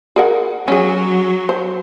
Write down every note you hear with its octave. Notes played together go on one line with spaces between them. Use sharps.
G#4 A#4 F#5
F#3 C#4 G#4
C5